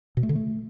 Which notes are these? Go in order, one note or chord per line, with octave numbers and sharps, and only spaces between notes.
B2
A3
D3
A3